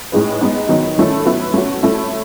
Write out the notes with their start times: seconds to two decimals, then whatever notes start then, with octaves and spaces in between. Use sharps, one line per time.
0.12 A2 G#3 D#4 G#4 B4
0.41 G#3 B3 D#4
0.69 D#3 F#3 B3 D#4
0.97 D#3 A3 C#4 E4 A4
1.25 F#3 B3 E4 B4
1.54 A3 C#4 F#4
1.83 A3 E4 A4 C#5